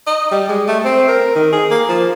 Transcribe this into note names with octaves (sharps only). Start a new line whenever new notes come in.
D#5
G3
G#3
A3
C4
A#4
D#3
G#4
A#3
F3